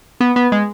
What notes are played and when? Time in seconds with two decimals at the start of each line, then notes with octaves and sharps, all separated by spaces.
0.21 B3
0.36 B3
0.52 G#3